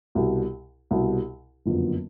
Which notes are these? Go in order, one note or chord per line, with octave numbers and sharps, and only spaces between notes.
C2 B2 G3
C2 B2 G3
F#1 F2 D3 F#3 B3